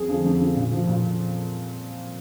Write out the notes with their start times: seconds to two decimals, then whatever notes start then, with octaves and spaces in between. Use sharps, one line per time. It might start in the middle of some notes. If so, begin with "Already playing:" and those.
Already playing: F2 G#4
0.08 D3 F3
0.24 F2
0.39 D3 F3
0.56 A#2
0.71 F3
0.87 A#2